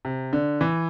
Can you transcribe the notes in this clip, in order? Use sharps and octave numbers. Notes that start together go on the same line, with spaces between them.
C3
D3
E3